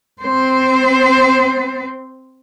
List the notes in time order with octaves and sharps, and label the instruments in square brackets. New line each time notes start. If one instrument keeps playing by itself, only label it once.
[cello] C4 C5